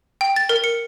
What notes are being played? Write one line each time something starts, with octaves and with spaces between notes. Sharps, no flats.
G5
A6
A#4
C#7